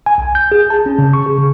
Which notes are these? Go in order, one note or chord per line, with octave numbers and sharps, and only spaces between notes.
G#5
B1
G6
G#4
A5
C#4
C#3
C#6
G#4
C#3